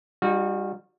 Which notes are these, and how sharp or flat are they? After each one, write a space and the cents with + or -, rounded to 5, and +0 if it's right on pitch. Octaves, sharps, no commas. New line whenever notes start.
G3 +20 D#4 +0 F#4 -30